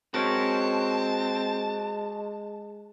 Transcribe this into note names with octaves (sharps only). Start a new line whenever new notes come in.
G#3 C4 F#4 A#4 C#5 A5